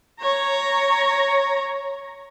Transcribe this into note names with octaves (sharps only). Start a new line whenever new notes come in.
C#5 A#5